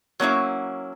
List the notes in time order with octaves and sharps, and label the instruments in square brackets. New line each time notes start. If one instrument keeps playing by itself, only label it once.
[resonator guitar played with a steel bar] F#3 A#3 C#4 E4